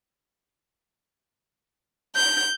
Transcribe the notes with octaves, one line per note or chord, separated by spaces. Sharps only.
G6